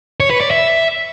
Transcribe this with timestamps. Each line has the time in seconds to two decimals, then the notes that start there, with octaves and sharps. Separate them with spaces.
0.20 C#5
0.30 B4
0.41 D5
0.51 E5